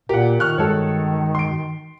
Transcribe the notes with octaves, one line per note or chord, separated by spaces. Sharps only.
A#2 F4 G4 A#4 F#5
D#3 C#6 F6 F#6
G2 G#3 F#4 A4 C#5
C6 D7